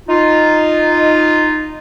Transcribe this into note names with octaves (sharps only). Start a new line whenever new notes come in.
D#4 F4